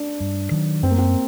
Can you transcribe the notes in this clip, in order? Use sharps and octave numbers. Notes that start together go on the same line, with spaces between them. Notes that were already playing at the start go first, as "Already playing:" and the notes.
Already playing: D4
G2
D#3 F#3
F#2 C4
A#3
C4